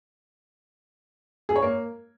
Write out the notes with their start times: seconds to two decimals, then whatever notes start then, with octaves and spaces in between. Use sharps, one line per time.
1.49 G#4
1.56 C#5
1.62 A#3